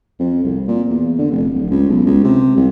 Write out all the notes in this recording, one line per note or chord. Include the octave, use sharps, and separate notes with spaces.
F2
C2
A#2
E2
D3
F1
D1
C#2
B1
C#2
C3
C2